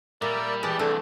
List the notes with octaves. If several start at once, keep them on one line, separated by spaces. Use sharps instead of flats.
A#2 G3 A#4 D5 E5
E3 G#3 G4 D5 A5
C2 A3 D4